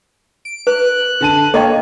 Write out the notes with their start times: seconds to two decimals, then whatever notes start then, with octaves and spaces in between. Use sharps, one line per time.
0.45 D7
0.67 B4 F#6
1.21 D3 A5 D#7
1.54 A#3 A4 C#5 D#5 G5